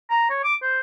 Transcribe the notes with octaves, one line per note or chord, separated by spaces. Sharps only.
A#5
C#5
D6
C5